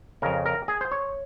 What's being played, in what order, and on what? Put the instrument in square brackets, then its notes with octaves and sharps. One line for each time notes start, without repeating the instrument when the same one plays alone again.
[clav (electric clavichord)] F2 C#3 A#4
A#4
G#4
C5
C#5